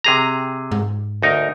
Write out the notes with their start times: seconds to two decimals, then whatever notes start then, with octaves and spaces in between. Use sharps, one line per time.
0.04 C3 G#4 A#5
0.71 G#2
1.22 D2 D#4 A#4